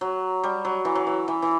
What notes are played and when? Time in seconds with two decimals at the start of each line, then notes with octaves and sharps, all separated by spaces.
0.01 F#3
0.44 G3
0.65 F#3
0.85 E3
0.95 F#3
1.07 E3
1.28 E3
1.42 E3